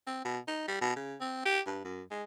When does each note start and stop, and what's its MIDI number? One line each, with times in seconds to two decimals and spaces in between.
0.07 0.24 60
0.25 0.39 47
0.48 0.63 63
0.68 0.79 55
0.81 0.95 47
0.96 1.15 49
1.20 1.42 60
1.45 1.60 67
1.67 1.82 43
1.84 2.02 42
2.11 2.23 56